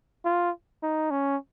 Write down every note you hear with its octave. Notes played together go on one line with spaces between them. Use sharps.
F4
D#4
C#4